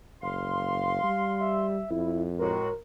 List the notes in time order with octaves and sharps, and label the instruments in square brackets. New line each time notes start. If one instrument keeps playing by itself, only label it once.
[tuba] F#1 [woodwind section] F5 C6
[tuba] G3
[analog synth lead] E5
[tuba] F2 [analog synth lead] E4
[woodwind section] A2 G#3 F#4 [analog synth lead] A#4